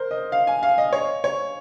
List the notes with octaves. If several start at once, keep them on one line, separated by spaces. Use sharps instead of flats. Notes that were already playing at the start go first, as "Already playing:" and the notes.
Already playing: A#4 C5
D#5
F5
G#5
F5
D#5
C#5
C#5